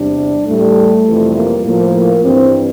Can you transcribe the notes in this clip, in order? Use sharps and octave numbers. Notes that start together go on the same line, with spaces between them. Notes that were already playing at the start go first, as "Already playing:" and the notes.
Already playing: E2 C3 G3 D4
A2 G3 A3
F2 C3 E3 G3
A#3
A2 F3 A#3
G2 E3 G3 C4